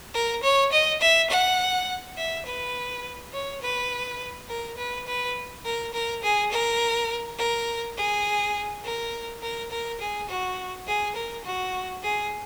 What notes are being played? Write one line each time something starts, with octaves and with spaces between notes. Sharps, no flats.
A#4
C#5
D#5
E5
F#5
E5
B4
C#5
B4
A#4
B4
B4
A#4
A#4
G#4
A#4
A#4
G#4
A#4
A#4
A#4
G#4
F#4
G#4
A#4
F#4
G#4